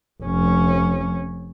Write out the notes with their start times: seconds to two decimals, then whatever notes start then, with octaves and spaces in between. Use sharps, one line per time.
0.23 F1 C#4